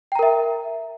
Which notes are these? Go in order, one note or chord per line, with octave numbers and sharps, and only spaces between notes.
A#4 E5 G5 A#5